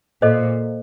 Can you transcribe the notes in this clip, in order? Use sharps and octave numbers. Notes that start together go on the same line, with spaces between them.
A#2 A4 C5 D#5